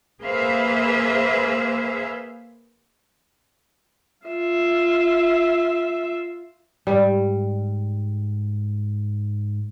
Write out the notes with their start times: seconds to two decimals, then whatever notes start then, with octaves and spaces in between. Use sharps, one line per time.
0.22 A#3 G#4 B4 C5 E5 F5
4.26 F4 E5
6.87 G#2 G3